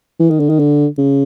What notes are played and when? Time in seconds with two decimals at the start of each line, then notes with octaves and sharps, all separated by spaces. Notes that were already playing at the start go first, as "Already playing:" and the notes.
0.20 E3
0.30 D#3
0.40 D3
0.49 D#3
0.59 D3
0.98 C#3